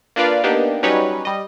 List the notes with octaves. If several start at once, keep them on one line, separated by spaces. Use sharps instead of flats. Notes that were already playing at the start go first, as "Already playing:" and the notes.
A#3 D4 F4 B4 D5 F5
A#3 B3 D4 D#4 G4
F#3 G3 C#4 D#4 B4 C#5
G3 D#5